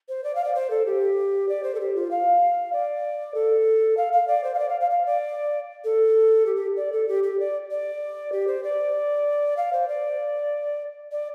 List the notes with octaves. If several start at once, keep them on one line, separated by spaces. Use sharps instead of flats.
C5
D5
F5
D5
C5
A4
G4
D5
C5
A4
G4
F4
F5
D5
A4
F5
F5
D5
C5
F5
D5
F5
F5
F5
D5
A4
G4
G4
D5
A4
G4
G4
D5
D5
G4
C5
D5
F5
C5
D5
D5